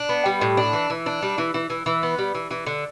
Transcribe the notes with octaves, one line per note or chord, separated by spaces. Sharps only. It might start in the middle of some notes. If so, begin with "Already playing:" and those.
Already playing: D4
B3
G3
A2
D4
E3
E3
D4
G3
E3
E3
E3
E3
B3
G3
E3
E3
D3